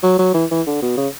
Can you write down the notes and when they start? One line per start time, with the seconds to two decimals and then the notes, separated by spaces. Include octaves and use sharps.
0.03 F#3
0.19 F#3
0.34 E3
0.51 E3
0.67 D3
0.82 B2
0.97 C#3